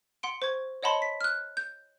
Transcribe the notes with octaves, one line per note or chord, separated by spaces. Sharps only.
F#5 C6 D7
C5 C#6 G#6
C#5 D#5 F#5 A5 B5 C6
B6
F6 F#6
G6